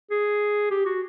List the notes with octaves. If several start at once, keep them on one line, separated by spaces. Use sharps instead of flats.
G#4
G4
F#4